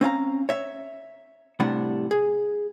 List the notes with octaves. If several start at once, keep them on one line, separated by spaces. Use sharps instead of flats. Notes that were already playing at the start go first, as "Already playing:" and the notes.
C4 C#4 F5 A#5
C#5 E5
A2 C3 G3 D4 F#5
G#4